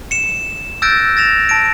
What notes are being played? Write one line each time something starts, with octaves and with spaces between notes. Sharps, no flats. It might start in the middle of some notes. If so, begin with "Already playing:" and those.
C#7 E7
E6 F#6 G6 A6 A#6 D7
A6 A#6 E7 F7
A5 A#6 D7